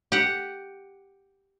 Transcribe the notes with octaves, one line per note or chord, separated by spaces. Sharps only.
G4 F#5